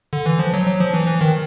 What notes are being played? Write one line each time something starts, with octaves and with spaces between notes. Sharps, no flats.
D3
E3
F3
F#3
F#3
F3
E3
E3
D#3